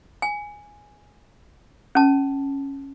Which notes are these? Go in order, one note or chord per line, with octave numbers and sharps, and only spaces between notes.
G#5
C#4 A5